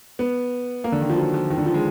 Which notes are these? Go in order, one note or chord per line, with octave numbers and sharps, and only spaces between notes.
B3
A#3
D3
D#3
F3
F#3
F3
D#3
D3
F3
G#3